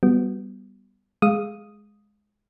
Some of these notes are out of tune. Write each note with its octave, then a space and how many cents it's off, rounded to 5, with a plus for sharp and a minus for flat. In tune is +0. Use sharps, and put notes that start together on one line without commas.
G3 +0 B3 +0 F#4 +0
G#3 +0 F5 +0 D#6 +0